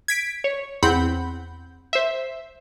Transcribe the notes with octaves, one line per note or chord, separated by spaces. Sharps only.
G#6 B6 D7
C#5
E2 C4 F#5 B5 G6
C5 E5